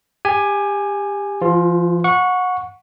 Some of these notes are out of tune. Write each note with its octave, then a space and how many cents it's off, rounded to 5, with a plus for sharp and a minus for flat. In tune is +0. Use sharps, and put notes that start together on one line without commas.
G4 +25 G#5 +0
F3 -40 F4 +15
F#5 -25 C#6 +5